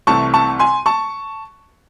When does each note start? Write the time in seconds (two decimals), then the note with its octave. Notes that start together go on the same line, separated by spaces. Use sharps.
0.07 C2 C3 E3 A3 A5 C#6
0.34 A5 C#6
0.59 G#5 C6
0.86 A5 C#6